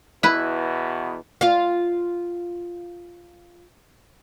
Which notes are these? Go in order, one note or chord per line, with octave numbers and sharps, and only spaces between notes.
E2 B2 E4 B4
F4 F5